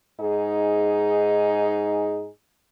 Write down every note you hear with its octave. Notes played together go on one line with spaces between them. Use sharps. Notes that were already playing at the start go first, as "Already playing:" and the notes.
G#2 D#4 G#4